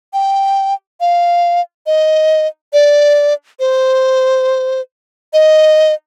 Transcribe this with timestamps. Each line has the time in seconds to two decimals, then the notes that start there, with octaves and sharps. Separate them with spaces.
0.13 G5
1.00 F5
1.86 D#5
2.73 D5
3.60 C5
5.33 D#5